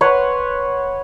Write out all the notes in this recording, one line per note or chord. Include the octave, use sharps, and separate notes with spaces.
B4 C#5 F#5 C6